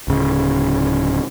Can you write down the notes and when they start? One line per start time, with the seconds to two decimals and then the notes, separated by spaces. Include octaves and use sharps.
0.08 D1 C#3